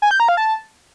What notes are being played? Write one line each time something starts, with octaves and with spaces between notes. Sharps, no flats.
G#5
G6
A#5
F5
A5